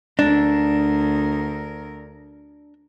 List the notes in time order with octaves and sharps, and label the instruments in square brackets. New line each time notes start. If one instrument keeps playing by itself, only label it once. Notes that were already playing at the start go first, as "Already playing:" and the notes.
[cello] D2 A#4 [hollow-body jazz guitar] D4